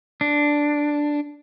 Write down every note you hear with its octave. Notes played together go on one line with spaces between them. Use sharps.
D4